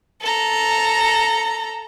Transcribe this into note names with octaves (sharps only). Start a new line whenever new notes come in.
A4 A#5